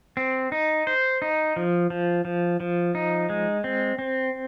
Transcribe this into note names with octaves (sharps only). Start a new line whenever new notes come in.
C4
D#4
C5
D#4
F3
F3
F3
F3
D#4
G#3
C4
C4